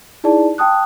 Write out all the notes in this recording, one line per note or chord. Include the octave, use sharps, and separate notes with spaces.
D#4 E4 G#4 D5 A5
G5 A5 D#6 F#6